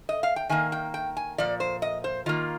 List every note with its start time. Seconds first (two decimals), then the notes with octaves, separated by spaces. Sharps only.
0.09 D#5
0.23 F5
0.36 G5
0.49 D#3 A#3 G#5
0.72 G5
0.94 G5
1.17 G#5
1.38 A#2 F3 D5
1.60 C5
1.82 D#5
2.04 C5
2.26 D#3 A#3 F4